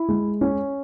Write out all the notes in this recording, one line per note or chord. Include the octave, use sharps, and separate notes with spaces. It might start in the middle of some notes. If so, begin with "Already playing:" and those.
Already playing: E4
G#3
C#4